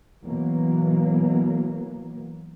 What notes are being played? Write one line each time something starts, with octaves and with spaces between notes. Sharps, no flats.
B2 E3 F#3 A#3